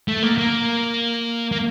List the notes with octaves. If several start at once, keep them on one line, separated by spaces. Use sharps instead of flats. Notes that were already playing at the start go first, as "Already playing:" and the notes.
A3
A#3
A#3
A#3